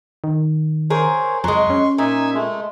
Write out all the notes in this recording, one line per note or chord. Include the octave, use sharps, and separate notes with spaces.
D#3
G#4 A#4 C5 C#5
F2 F#3 G#3 C6 C#6
C#4
A#2 D#4 E5 G#5
G#3 A3